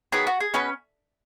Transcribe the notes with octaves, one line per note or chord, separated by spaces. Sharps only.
D#3 F#3 B3 G#4
F#4
G#4
B2 B3 C#4 G#4 B4